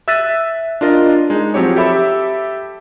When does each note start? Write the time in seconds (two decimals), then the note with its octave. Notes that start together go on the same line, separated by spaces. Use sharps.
0.08 E5 E6 F#6 A6 B6 D#7
0.81 D4 F4 A#4 D#5
1.30 G#3 D#4
1.54 F3 F#3 C4 G4 C#5
1.76 G4 A4 E5 B5 D6 E6